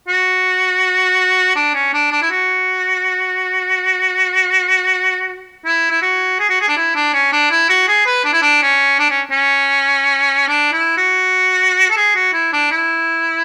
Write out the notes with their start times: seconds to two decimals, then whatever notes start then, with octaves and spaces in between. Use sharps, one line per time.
0.08 F#4
1.56 D4
1.74 C#4
1.93 D4
2.12 D4
2.22 E4
2.31 F#4
5.65 E4
5.90 E4
6.02 F#4
6.39 G#4
6.49 F#4
6.61 G#4
6.68 D4
6.77 E4
6.95 D4
7.14 C#4
7.33 D4
7.51 E4
7.69 F#4
7.88 G#4
8.06 B4
8.25 D4
8.33 E4
8.42 D4
8.62 C#4
8.99 D4
9.10 C#4
9.31 C#4
10.48 D4
10.73 E4
10.97 F#4
11.90 A4
11.97 G#4
12.15 F#4
12.33 E4
12.53 D4
12.71 E4